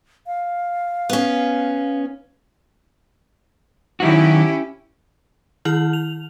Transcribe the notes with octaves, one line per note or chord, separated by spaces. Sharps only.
F5
B3 C#4
D#3 F#3 C#4 E4 F#4 G4
D#3 E4 F6 F#7
F7